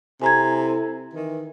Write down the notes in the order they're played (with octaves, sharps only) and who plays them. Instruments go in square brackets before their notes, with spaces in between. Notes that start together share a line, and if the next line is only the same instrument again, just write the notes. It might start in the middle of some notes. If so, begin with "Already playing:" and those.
[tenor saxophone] C3 [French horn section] E4 A4 [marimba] G#5 A#5 G#6
[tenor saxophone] D#3 [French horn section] E3